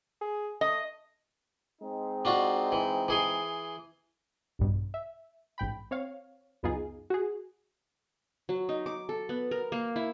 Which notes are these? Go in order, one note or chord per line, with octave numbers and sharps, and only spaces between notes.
G#4
A3 D#5
G#3 C4 D#4
D4 F4 F#4
E3
E3 G#4 C6
A#1 G2 B2
E5
A1 G#2 G5 B5
C4 C#5 F5
C#2 F#2 B3 D#4 F4 G#4
F#4 G#4
F#3
D#4
D6
A4
B3
A#4
A#3
E4